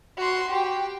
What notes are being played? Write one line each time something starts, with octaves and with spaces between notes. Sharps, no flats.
F#4 C6
G4 G5